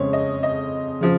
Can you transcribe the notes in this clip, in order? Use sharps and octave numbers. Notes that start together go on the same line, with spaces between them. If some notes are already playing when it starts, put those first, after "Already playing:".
Already playing: F2 C#3 G#3 C4 C#5
D#5
D#5
C#3 F3